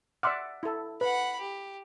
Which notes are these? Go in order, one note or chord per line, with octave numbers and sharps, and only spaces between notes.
D5 E5 F#5 C6 D6 F6
E4 A4
B4 F#5 B5
G4